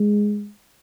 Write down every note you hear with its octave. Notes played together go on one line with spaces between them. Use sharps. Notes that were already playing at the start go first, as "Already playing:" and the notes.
Already playing: G#3